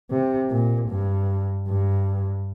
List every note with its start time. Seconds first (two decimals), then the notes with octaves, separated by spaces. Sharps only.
0.11 C3
0.51 A#2
0.89 G2
1.68 G2